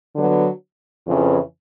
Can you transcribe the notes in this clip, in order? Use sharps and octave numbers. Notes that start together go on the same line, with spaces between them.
D3 F#3 B3
F2 C#3 E3